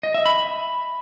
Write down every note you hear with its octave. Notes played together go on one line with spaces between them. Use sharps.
D#5
E5
B5